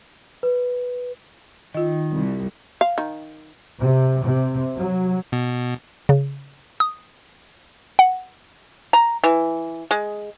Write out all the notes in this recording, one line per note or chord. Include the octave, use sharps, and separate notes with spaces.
B4
D#3 F4 D#5
C2
F5
D#3
C3
C3
F#3
B2
C#3
D#6
F#5
A#5
E3
G#3